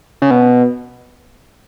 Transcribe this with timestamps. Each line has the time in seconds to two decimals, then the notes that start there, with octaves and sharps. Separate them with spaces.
0.22 C#3
0.31 B2